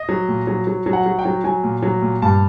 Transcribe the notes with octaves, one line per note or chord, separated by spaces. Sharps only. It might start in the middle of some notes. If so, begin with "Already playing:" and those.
Already playing: D#5
F#3
A#2
F#3
F#3
F#3
F#5
F#3
G5
F#3
F#3 G#5
A#2
F#3
A#2
G2 A5